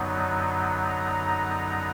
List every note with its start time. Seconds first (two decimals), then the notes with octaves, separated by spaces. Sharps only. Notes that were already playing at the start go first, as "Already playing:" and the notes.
Already playing: F#2 D3 F#3 B3 D#4
0.88 A#5